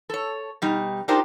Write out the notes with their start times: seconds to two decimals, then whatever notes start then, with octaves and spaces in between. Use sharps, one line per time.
0.10 A4 C#5
0.62 B2 G3 D#4
1.08 D4 D#4 F4 G4 A#4 C5